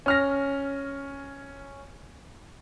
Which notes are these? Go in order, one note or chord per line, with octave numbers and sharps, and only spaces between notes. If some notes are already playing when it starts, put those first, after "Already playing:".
C#4 F6 A#6